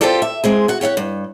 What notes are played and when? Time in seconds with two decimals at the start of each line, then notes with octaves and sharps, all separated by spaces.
0.01 C4 D#4 F4 G4 A4 D5
0.22 E5
0.44 G#3 C4 G#4
0.68 F#4 F#5
0.81 G4 C#5 F5 F#5
0.97 G2